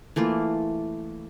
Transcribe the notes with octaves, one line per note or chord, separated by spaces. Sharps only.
E3 A3 A#3 F4